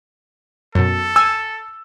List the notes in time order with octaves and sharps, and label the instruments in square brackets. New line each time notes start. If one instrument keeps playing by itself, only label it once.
[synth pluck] F#2 B2 [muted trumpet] A4
[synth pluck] G#5 [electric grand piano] E6